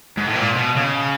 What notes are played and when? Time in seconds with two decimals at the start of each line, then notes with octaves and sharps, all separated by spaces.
0.18 G#2
0.28 A2
0.36 A#2
0.56 B2
0.76 C#3